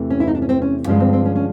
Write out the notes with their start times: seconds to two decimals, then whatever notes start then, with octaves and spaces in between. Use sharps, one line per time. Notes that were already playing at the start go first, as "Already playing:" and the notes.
Already playing: E2 C3 E3 A3
0.10 C#4
0.20 E4
0.28 D#4
0.35 D4
0.42 C#4
0.49 C4
0.62 C#4
0.87 G2 D3 F3 G#3 C#4
1.00 C4
1.13 C4
1.25 C#4
1.36 C#4